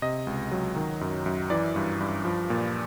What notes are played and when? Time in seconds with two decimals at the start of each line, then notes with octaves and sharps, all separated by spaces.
0.02 C3 D#5
0.27 C#2
0.51 F#3
0.76 D#3
1.01 F#2
1.26 F#2
1.50 E3 D5
1.76 G2
2.00 G2
2.25 F3
2.50 A#2